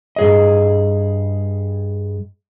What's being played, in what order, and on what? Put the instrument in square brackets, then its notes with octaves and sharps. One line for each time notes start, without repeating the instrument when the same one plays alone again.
[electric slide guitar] G2 G#4 D#5